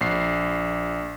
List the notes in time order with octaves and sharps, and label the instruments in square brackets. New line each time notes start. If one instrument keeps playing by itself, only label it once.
[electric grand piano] A#1 C7